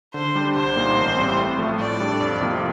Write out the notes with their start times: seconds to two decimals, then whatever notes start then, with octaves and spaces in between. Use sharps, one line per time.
0.14 D3 C5
0.35 G3 D4 G4
0.55 C2 C5
0.76 A#2 G3 A#3 D#4
0.97 A1
1.17 A2 G3 C4
1.38 A2
1.59 F3 A3
1.79 A2 D5
2.00 G3 D4 A4
2.21 F2
2.41 C3 F3 A#3 F4